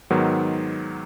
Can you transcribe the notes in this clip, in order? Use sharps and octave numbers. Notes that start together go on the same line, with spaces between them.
G#2 D#3 F#3 B3